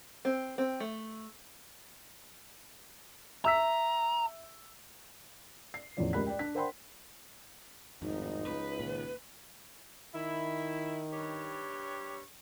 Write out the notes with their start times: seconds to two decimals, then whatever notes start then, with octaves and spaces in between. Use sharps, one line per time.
0.25 C4
0.58 C4
0.80 A3
3.45 E5 A#5 E6 B6
5.74 C7
5.97 E2 A2 C#3 F3 C#5 D5
6.13 C#2 G4 A#4 B5 F#6 B6
6.26 D5 G5
6.39 D4 B6
6.55 A#4 C5 F#5 G5 B5 C6
8.02 G#1 F2 A2 D#4
8.47 C#2 B4
8.80 A#2 D#3
10.15 D#3 E4
11.12 G2 G4 C#5